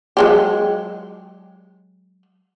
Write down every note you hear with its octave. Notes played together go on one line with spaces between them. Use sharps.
F#3 G#3 G4